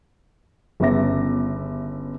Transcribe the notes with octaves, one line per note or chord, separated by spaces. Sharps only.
G1 C#3 B3 E5 D6 A#6